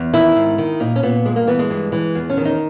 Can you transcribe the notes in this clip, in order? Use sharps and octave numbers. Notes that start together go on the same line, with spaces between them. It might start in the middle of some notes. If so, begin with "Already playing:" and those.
Already playing: E2
D#3 E4
G#2
D#3
A#2 D#4
C#4
A#2 B3
G2 G#3
A#3
E3 B3
G#3
G2
E3
E2
C#4
D#3
D#4